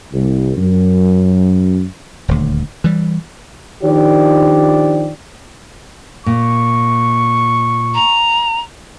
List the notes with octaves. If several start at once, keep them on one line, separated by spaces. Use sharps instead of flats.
C2
F#2
D#1 D2
E3 G3
D#3 F3 D4 G4 D5
A#2 C#6
A#5